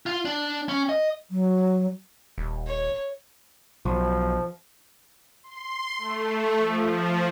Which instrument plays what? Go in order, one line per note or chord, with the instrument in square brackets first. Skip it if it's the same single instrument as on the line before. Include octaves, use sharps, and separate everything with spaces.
[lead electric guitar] F4
D4
C#4
D#5
[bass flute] F#3
[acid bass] D#1
[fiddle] C#5
[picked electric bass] B1 [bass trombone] F3
[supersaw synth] C6
A3
F3